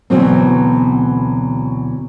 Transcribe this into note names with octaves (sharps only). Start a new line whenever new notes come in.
D2 B2 E3 F#3 B3 C4